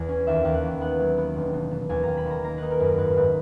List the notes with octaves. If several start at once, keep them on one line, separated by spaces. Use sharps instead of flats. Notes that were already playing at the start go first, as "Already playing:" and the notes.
Already playing: E2 G#5
C#4
D#2 E5
D#2
F#5
E3
B3 F#5
F#3
B3
E1
B2
B2
D#2 G#5
D#2 A#5
B5
D#3 A#5
A#3 A#5
D#4 B4
A#4
F#2 B4
G#2 B4
G#2 B4